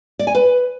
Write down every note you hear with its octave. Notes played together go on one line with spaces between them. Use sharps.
D5
G#5
B4